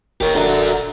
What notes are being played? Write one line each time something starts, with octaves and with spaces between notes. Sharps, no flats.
D#1 G4 A#4 C#5
D3 F#4 A#4